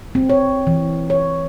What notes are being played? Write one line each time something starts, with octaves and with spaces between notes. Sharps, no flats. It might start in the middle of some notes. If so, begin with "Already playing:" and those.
C4
C#5
E3
C#5